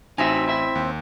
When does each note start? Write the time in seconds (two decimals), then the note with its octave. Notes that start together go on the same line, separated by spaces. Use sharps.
0.18 A1 C4 D#4 F#4 E5 G#5
0.48 E4 E5
0.75 D#2